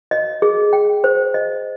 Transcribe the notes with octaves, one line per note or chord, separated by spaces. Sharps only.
D#5
G#4
G5
C5
D#5